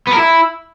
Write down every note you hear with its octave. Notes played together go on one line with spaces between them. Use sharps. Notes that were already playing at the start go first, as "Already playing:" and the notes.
B3
A#4
E4